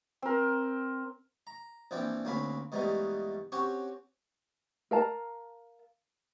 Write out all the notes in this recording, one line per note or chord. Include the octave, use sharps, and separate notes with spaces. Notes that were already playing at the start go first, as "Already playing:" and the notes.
C4 A#4
A#5
A#1 E3 F3 C4 D5 G5
D2 A#3 C4 C#4 F5 B5
G#2 B2 E3 G3 A3 D#4
C4 C#4 F#4 G4 C#5
A#4 F5 A5 A#5